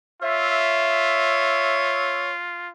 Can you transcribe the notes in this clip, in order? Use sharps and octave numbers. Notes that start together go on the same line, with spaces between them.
F4 C#5 E5